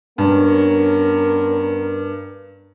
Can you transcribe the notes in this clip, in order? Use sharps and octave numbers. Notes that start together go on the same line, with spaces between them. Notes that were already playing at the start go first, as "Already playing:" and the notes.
G2 B3 C#4 A#4